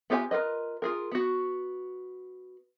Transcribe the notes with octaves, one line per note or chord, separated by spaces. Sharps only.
B3 F4 G4 E5 G#5
F4 A#4 B4 D#5
F4 G#4 A#4
B3 F#4